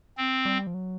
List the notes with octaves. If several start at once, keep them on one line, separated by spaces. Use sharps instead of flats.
C4
G3
F3
F#3